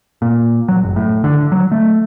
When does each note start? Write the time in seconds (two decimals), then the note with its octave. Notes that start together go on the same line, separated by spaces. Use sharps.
0.22 A#2
0.68 F#3
0.83 F#1
0.96 A2
1.24 D3
1.52 F#3
1.72 A3